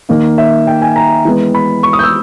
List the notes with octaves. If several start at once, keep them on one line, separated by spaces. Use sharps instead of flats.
D#3 A#3 D#4
E5
G5
G#5
A#5
E3 G#3 B3
B5
C#6
D#6
G6
E6